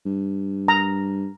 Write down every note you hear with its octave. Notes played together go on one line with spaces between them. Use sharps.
G2
A#5